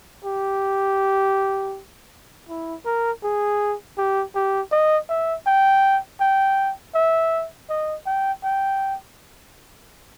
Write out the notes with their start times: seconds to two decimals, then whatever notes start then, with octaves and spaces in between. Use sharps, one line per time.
0.25 G4
2.49 E4
2.86 A#4
3.23 G#4
3.98 G4
4.35 G4
4.72 D#5
5.09 E5
5.47 G5
6.20 G5
6.94 E5
7.70 D#5
8.06 G5
8.44 G5